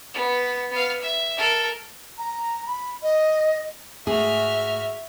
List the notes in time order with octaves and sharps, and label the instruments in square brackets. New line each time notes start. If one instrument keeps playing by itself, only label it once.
[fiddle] B3
B3 F5
E5
A4 A#4
[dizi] A#5
B5
D#5
[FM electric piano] G#2 A3 [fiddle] F#4 F6 [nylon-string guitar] G#4 [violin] E5